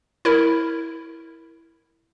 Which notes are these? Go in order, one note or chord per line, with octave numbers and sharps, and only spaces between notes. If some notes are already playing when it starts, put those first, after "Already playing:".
E4 A#4